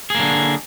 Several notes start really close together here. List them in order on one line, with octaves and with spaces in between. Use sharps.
G#4 A#3 D3